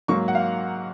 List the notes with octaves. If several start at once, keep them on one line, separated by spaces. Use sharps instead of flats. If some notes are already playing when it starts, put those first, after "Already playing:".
G#2 F#3 A#3 C#6
F#5
F5